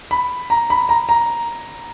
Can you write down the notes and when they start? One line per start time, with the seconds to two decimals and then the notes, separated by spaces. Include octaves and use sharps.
0.11 B5
0.50 A#5
0.70 B5
0.89 A#5
1.09 A#5